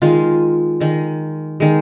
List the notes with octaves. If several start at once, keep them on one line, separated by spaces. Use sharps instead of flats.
D#3 G#3 F4
D#3 G#3
D#3 G#3